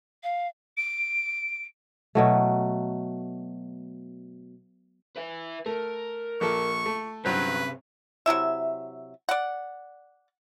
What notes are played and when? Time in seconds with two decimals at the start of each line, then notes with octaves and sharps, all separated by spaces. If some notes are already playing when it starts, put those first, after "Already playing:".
0.23 F5
0.77 D7
2.15 B2 F#3 A3
5.16 B4 E5
5.66 A3 A#4
6.41 A#1 A#3 A4 C#6
6.86 A3
7.25 G2 C3 F#3 C#4 B4 C5
8.26 C3 F#3 E4 E5
9.29 D5 F#5